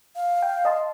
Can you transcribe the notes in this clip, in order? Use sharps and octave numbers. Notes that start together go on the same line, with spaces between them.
F5
G5
D#5 A5 C6